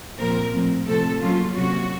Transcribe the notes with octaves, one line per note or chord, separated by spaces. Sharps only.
A#2 F3 C4 A#4
A2 F3 C4
C3 F3 A3 C4 A4
C#3 F#3 A#3 C#4 F4
C3 F#3 A#3 C#4 F#4